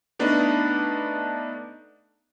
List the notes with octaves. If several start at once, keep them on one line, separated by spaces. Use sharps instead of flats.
A3 B3 D4 D#4